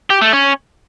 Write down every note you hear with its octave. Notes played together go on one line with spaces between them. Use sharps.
G4
A3
C#4